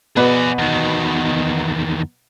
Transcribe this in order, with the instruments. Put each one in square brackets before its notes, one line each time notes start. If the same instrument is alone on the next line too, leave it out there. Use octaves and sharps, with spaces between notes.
[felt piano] B2 B4 [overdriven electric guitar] G#4 D5
[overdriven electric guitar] E2 D#3